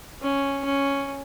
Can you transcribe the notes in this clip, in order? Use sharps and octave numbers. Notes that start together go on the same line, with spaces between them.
C#4
C#4